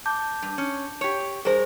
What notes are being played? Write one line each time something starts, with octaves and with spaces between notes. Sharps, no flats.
A5 D6 G6
G2
C#4
G4 C#5
G2 G#4 A#4 C5